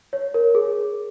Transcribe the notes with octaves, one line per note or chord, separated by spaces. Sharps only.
C#5
A#4
G#4